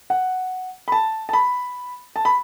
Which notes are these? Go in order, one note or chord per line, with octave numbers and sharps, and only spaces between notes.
F#5
B5
A5
A5
B5
A5
B5